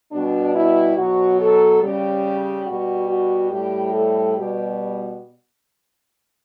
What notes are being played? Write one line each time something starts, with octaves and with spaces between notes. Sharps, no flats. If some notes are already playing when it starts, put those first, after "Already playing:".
B2 G3 D4
E4
B2 F#3 F#4
A4
C#3 G3 G4
B2 G3 F#4
F#4
A2 G3 G4
A4
B2 G3 G4